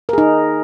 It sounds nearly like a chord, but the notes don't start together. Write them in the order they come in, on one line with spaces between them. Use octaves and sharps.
A#4 G#4 D#4